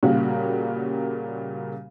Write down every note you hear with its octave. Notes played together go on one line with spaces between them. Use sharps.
A#2 C#3 G3 A#3 F#4